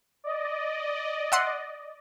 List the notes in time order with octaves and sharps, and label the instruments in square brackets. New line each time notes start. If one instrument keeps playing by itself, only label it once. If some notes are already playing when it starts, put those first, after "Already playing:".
[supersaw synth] D5 D#5
[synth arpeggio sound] E5 F#5 C6